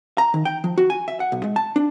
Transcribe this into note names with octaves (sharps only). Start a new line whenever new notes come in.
A#5
D#3
G5
F3
F#4
G#5
E5
F#5
B1
G#3
A5
D4